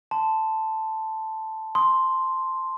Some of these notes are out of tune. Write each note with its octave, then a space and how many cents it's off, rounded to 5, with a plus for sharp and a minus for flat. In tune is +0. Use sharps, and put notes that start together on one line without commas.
A5 +0 C6 -20
C6 +0 D#6 +0